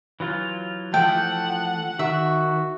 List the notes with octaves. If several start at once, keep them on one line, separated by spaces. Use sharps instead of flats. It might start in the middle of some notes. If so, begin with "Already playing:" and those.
E3 F#3 F4
E3 F3 A3 F#5 G5 A5
D#3 F#4 E5